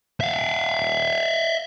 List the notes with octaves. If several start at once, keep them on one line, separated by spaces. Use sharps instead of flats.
E5 F5